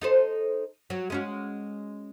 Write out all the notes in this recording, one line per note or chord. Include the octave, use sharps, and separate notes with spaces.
D#4 A4 C5
F#3
G#3 C#4 F#4